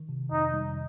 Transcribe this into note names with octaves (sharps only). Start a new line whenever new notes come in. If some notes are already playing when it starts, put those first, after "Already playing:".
Already playing: D#3
C3
F2 D#4
G3